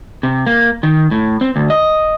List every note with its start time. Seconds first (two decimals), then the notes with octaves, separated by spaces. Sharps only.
0.23 C3
0.46 A#3
0.83 D#3
1.11 A2
1.41 C4
1.56 D2
1.70 D#5